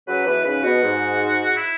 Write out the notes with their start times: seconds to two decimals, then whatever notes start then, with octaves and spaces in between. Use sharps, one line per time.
0.07 C#3 F#3 B4
0.26 B2 E3 B4
0.45 G#2 C#3 B4
0.63 B2 F#4
0.82 G#2
1.56 E4